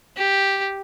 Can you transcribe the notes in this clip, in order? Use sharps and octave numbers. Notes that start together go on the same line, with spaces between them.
G4